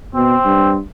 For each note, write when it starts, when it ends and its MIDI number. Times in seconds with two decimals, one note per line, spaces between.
0.15 0.36 47
0.15 0.74 60
0.45 0.79 43